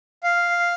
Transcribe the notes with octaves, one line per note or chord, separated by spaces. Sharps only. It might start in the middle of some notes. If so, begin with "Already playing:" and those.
F5